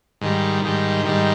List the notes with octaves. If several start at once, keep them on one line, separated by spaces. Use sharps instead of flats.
G#2 D#3 G3
G#2 D#3 G3
G#2 D#3 G3